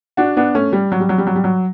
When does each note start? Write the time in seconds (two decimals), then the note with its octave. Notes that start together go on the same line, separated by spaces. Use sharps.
0.17 D4 F#4
0.37 B3 D4
0.55 A3 C#4
0.73 G3
0.92 F#3
1.00 G3
1.09 F#3
1.18 G3
1.27 F#3
1.35 G3
1.44 F#3